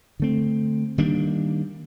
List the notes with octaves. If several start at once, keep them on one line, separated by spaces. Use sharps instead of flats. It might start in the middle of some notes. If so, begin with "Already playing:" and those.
D3 A3 C4
D#3 G3 A#3 D4